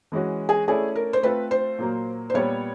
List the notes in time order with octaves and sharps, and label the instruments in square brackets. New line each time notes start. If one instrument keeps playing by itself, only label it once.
[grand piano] E3 G#3 C#4 F#4
[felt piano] G#4
[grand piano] A3 C#4 E4 A4 D5 [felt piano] G#4
[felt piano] A#4
C5
[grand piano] A3 C4 F4 A4 [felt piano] B4
[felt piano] C5
[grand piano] A#2 F#3 A#3
[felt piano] C5
[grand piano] A#2 G3 B3 [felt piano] C#5